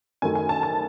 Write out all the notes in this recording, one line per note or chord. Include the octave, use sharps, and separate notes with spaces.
F#2 D#3 A3 G#5
G#5
A5
A5